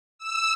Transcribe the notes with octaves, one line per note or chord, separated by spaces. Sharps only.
E6